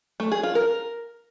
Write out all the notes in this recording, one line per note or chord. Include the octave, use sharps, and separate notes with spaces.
A3
G#4
F4
A#4